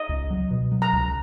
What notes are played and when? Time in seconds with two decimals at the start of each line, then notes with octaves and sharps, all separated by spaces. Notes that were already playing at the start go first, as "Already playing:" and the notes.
Already playing: D#5
0.09 C#2
0.30 F#3
0.50 B2
0.72 F#3
0.82 A#5
0.93 C#2